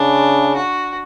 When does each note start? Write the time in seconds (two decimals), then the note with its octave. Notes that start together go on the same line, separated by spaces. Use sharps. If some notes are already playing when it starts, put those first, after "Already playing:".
Already playing: C#3 D4
0.56 F#4